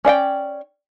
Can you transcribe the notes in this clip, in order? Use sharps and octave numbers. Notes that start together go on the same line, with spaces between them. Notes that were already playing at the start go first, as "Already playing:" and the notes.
C#4 D5 F#5 G5